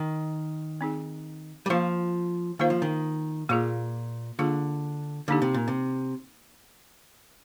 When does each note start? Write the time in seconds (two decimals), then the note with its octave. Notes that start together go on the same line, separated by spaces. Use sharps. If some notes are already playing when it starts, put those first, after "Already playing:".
Already playing: D#3
0.81 C4 D#4 G#4
1.66 G3
1.70 F3 A#3 F4 C5 F5
2.59 D#3 A#3 F4 C5 F5
2.70 F3
2.82 D#3
3.49 A#2 A#3 F4 G#4
4.39 D3 A#3 F4 G#4
5.28 D3 A#3 D#4 G4
5.42 C3
5.54 A#2
5.68 C3